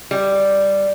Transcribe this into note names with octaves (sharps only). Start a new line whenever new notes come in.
G3